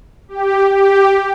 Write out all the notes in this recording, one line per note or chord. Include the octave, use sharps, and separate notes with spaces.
G4
G4